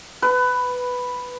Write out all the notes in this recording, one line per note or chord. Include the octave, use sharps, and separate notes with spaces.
B4